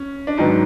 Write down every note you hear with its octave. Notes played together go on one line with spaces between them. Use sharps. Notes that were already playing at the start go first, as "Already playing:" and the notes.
Already playing: C#4
D4
G#2 D#3 F#3 B3 D#4